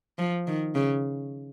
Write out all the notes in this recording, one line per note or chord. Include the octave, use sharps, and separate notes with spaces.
F3
D#3
C#3